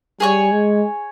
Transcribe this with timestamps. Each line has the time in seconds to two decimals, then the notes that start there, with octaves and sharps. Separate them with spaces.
0.20 G3 G#4 C#5 G#5
0.52 G#3